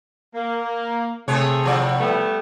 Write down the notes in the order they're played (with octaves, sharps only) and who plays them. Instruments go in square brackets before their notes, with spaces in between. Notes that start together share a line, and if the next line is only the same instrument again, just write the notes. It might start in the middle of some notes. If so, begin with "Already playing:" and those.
[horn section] A#3
[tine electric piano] C3 [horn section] A3 C4 G#4 [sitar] C#5
[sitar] A2 F3 D5
[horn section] G3 A3 B3